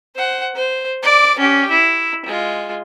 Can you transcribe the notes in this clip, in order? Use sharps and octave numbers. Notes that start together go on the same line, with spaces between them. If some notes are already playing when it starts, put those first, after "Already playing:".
C5 F#5
C5
D5 D6
C#4 G4
E4
G#3 F4